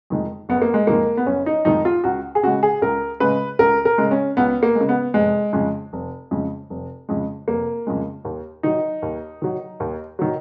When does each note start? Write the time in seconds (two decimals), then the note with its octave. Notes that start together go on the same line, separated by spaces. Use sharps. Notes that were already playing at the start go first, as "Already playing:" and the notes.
0.10 F2 D#3 G#3
0.49 F#1 B3
0.62 A#3
0.74 G#3
0.87 F2 D#3 G#3 A#3
1.17 B3
1.27 F#1 C#4
1.46 D#4
1.65 F2 D#3 G#3 D#4
1.85 F4
2.04 C#2 F#4
2.35 G#4
2.43 C#3 G#3 F#4
2.63 G#4
2.82 C#2 A#4
3.20 C#3 G#3 B4
3.59 C#2 A#4
3.85 A#4
3.98 C#3 G#3
4.11 C#4
4.37 C#2 B3
4.63 A#3
4.75 G#3
4.81 C#3
4.89 B3
5.14 F1 G#3
5.53 F2 C#3 G#3
5.93 F1
6.31 F2 C#3 G#3
6.70 F1
7.09 F2 C#3 G#3
7.48 F1 A#3
7.87 F2 C#3 G#3
8.25 D#2
8.63 D#3 F#3 D#4
9.02 D#2
9.42 D#3 F#3
9.80 D#2
10.19 D#3 F#3